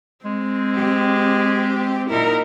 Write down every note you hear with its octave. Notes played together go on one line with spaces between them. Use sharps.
G#3 C4
G4
A#2 D#4 E4 A#4